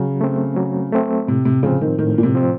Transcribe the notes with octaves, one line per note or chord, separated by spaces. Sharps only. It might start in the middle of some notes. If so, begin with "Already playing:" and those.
Already playing: C#3 F#3
A3 C4
F#3
A3 C4
A2 C3
C3
C#3 F3 C4
D#3
A2 D#3
A#2
C3
F3 C4